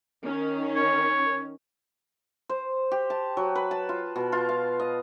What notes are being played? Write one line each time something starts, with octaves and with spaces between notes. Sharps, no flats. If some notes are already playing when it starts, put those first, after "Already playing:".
D#3 C#4
C#5
C5
G4
A5
F#3
B4
A5
F4
B2
F4
F5
D#5